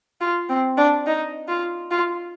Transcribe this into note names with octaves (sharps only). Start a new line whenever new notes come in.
F4
C4
D4
D#4
F4
F4